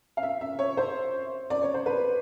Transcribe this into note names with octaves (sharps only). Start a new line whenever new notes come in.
F5
E5
E5
C#5
C5
D5
C#5
C5
B4